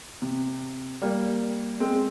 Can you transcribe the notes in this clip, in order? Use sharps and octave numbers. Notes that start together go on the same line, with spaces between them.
C3
G3 A#3
G#3 C4